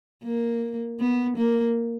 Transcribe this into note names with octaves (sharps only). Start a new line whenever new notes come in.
A#3
B3
A#3